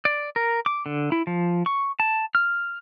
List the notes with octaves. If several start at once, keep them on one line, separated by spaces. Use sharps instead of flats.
D5
A#4
D6
D3
E4
F3
C#6
A5
F6